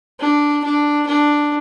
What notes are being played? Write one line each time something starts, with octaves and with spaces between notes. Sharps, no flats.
D4
D4
D4